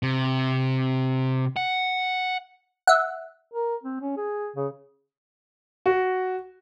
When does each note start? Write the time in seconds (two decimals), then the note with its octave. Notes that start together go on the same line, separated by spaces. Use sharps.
0.03 C3
1.56 F#5
2.87 E5 F#5
3.53 A#4
3.83 C4
4.01 C#4
4.17 G#4
4.56 C#3
5.86 F#4